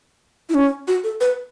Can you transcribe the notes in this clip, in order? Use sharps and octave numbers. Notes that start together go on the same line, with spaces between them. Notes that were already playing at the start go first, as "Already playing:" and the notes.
E4
C#4
F#4
A4
B4